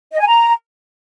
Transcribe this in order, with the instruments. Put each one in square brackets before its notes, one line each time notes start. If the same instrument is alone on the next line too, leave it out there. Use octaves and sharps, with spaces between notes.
[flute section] D#5
G#5
A#5